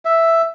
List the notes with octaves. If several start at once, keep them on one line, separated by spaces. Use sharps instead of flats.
E5